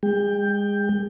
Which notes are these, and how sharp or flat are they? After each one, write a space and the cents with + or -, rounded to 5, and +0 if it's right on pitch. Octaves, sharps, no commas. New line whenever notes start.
G#3 -30 G5 +10